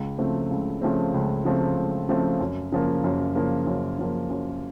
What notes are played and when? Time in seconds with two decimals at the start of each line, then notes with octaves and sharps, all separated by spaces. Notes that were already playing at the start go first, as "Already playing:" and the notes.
Already playing: C#2
0.18 C#3 F3 A3 C4
0.51 C#2
0.82 C#3 F3 A3 C4
1.14 C#2
1.45 C#3 F3 A3 C4
1.77 C#2
2.09 C#3 F3 A3 C4
2.40 F#2
2.72 C#3 F3 A#3
3.04 F#2
3.35 C#3 F3 A#3
3.67 F#2
3.99 C#3 F3 A#3
4.30 F#2